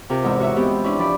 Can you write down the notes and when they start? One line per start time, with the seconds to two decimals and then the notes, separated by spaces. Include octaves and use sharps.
0.10 C3 F4 A#4
0.24 E2 G#2 E6
0.40 F#4 C#5 E5 E6
0.56 G#3 B3 C4 E4 G4
0.84 C#4 D4 E4
0.98 F3 D5 B5